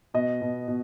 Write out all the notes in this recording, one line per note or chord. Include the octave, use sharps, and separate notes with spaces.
B2 D#5
B2
B2